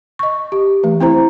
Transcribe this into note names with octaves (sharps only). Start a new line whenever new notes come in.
D#5 C#6
G4
E3 A3
C4 E4 C5 A#5